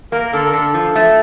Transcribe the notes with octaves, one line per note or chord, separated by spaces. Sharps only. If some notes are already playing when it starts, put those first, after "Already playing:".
A#3 A#4
D3 A4
A#4
D3 A4
F3
A3